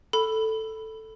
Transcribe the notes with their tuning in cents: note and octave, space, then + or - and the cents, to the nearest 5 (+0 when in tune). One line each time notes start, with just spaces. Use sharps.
A4 +5 B5 +0